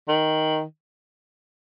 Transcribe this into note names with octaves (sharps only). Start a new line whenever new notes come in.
D#3